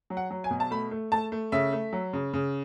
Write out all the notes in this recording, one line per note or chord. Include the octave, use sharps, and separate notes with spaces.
F#3
F#5
F#3
G#5
B2
A5
A3 B5
A3
A3 A5
A3
C#3 E5
A3
F#3
C#3
C#3